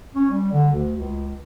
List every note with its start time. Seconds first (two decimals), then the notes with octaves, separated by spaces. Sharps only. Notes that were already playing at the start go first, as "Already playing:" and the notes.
0.15 C#4
0.30 G3
0.52 D3
0.72 D2
0.97 C#2